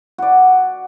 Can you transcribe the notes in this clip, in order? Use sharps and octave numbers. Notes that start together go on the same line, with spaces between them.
F#4 D5